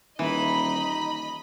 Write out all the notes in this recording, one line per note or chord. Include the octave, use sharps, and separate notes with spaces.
D#1 E3 D#4 D#5 B5